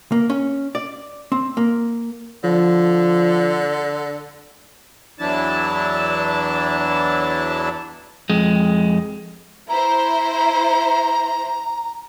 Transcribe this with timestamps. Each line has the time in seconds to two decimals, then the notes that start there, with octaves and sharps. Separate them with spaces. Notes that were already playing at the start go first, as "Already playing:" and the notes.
0.12 A#3
0.30 C#4
0.75 D5
1.32 C4
1.57 A#3
2.44 D3 F3
5.18 E2 E3 F#3 D4 E4 A5
8.30 F2 G#3
9.69 E4 C5 A#5